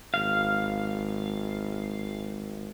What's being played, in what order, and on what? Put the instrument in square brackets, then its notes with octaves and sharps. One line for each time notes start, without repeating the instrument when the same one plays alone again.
[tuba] G#1 [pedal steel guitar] F5